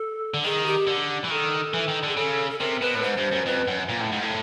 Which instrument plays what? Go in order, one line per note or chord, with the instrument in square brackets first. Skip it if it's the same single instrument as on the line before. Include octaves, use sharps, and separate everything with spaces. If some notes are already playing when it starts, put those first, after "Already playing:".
Already playing: [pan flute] A4
[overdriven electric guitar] D3
[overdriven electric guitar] D#3 [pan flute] G#4
[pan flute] G4
[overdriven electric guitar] D3
E3
[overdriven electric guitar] D#3 [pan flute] A4
[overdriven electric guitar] E3
D#3
D3
[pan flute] G#4
[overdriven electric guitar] C#3 [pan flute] A4
[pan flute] A4
[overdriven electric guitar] C3 [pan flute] A#4
[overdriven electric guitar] B2 [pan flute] B4
[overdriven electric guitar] A2
[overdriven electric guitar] G#2 [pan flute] C5
[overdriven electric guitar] G2
F#2
[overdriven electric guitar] F2 [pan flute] B4
[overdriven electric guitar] F#2
A#2
A2
G#2
A2